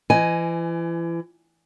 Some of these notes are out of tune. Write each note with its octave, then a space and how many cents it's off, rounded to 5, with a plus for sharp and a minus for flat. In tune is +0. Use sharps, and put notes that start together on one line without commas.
E3 +35 D#5 +0 G#5 +0